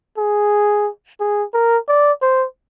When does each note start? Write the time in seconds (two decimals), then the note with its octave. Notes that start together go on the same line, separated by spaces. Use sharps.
0.18 G#4
1.20 G#4
1.54 A#4
1.88 D5
2.22 C5